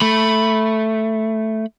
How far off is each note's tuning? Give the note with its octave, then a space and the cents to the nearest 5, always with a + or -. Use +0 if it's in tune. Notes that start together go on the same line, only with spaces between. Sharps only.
A3 +0 B5 +0